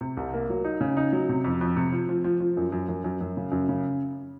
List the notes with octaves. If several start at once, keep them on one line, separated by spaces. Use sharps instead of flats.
C3
C2
A#3
F#3
D#4
C#3
D#4
F#3
C3
F2
F2
C3
F3
F3
F3
F3
F#2
F#2
F#2
F#2
F#2
C#3
F#2
C#3